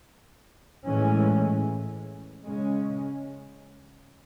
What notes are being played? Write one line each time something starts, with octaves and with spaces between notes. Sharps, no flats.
A2 E3 G#3 C#4
C#3 G#3 C#4